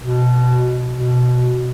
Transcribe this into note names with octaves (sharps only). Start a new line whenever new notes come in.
B2
B2